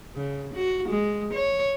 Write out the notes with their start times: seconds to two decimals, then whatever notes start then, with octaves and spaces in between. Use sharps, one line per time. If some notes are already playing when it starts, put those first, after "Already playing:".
0.16 C#3
0.55 F#4
0.89 G#3
1.33 C#5